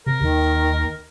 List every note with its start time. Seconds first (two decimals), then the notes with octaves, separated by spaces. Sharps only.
0.06 C3 A#4
0.21 D#2 D#3